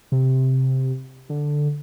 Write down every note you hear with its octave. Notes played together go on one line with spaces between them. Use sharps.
C3
D3